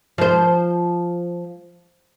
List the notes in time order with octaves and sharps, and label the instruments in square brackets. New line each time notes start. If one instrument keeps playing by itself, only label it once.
[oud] F3 C5